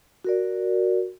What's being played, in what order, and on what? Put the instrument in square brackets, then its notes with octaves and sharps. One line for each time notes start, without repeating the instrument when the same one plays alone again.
[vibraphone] F#4 A#4 D5